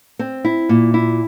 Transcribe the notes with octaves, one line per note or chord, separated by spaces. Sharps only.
C4
E4
A#2
E4